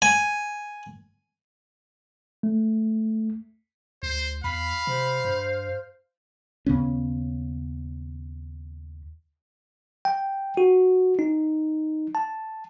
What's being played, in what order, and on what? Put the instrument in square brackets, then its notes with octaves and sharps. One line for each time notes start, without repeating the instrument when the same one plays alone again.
[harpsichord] G#5
[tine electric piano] A3
[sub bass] D2 [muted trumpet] C5
[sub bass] E2 [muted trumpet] F5 [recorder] B5
[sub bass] C3 [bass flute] C5
[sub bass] G2
[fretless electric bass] D#2 C#3 B3 C#4
[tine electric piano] G5
F#4
D#4
A5